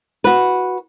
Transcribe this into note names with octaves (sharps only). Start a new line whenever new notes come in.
F#4 B4